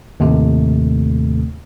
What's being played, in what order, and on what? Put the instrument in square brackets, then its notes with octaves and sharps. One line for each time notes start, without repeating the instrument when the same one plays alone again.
[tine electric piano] D#2 A2 C3 A3